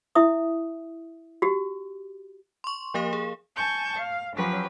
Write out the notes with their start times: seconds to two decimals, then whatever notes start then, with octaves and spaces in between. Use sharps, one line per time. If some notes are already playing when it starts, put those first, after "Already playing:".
0.15 E4 E5 D#6
1.42 F#4 G4
2.64 C6 C#6
2.94 F3 A#3 G4 A#4 F5 E7
3.13 G#4
3.56 G#5 A5 C#6 G6
3.96 F5
4.35 F3 F#3 C#4 G4 B4